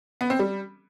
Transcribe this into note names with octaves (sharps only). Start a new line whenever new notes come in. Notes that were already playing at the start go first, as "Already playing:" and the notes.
B3
C4
G3